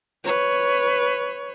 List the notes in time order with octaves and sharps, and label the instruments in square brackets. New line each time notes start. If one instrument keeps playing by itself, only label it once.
[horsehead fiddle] B4 C#5